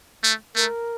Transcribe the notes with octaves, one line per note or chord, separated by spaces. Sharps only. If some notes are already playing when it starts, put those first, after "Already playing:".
A3
A3 A#4